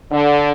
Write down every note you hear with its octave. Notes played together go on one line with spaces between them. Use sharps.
D3